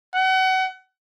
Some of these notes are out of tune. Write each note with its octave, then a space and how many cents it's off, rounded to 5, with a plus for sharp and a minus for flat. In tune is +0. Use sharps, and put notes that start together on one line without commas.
F#5 +30